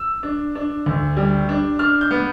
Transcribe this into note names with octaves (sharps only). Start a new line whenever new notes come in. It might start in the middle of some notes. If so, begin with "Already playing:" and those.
Already playing: E6
D4
D4
D2
G3
D4
D4 F6
G6
B3